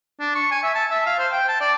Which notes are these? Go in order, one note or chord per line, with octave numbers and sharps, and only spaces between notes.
D4
C#6
G#5
E5
A5
E5
F5
C5
G5
A5
D5